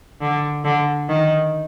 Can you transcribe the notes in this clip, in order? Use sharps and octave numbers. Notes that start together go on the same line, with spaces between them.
D3
D3
D#3